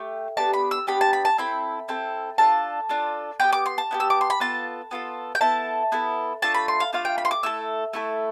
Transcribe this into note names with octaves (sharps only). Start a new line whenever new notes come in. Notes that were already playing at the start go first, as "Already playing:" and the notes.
Already playing: A3 G4
B3 D4 G4 A5
B5
E6
B3 D4 G4 B5
A5
B5
A5
C4 E4 A4 B5
C4 E4 A4
D4 F4 A4 A5
D4 F4 A4
B3 E4 G4 G5
D6
C6
A5
B3 E4 G4
E6
D6
C6
B5
B3 F4 A4 A5
B3 F4 A4
G5
B3 E4 A4 A5
B3 E4 A4
A3 D4 F4 A5
B5
C6
F5
A3 D4 F4 F5
G5
B5
C6
D6
A3 E4 A4 E6
A3 E4 A4